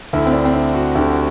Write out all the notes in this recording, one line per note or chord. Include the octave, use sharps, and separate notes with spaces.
D2 D3 E4
C4
D4
C4
D4
F#4
D2 D3 G4